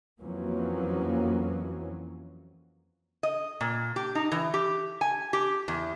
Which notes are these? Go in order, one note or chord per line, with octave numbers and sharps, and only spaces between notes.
F2 E3 F#3 A#3 C#4
D#5
A#2
G4
D#4
E3
G4
G#5
G4
E2